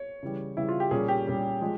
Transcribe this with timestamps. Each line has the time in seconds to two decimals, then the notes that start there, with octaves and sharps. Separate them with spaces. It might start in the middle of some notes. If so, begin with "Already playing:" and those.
Already playing: C#5
0.23 C#3 E3 G3
0.57 C#3 E3 G3 E4
0.69 F4
0.80 G4
0.91 A#2 G3 C#4 G#4
1.08 G4
1.26 A#2 G3 C#4
1.61 F3 G#3